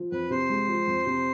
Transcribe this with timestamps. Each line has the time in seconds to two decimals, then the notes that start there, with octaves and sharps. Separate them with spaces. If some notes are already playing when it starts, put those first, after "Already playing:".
Already playing: F3
0.12 F2 B4
0.30 C3 C5
0.49 G#3
0.68 F3
0.87 F2
1.06 C3